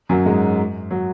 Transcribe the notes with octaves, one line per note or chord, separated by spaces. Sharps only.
F#2 F#3
G#2 G#3
F#3